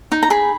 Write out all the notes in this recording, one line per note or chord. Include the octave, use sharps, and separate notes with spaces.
D#4
A#5
G#4 B5